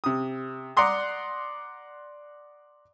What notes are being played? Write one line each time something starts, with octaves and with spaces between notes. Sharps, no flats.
C3 D#6
D5 F#5 A#5 C6 D#6